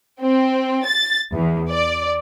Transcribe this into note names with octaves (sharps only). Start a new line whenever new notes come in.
C4
A6
E2
D5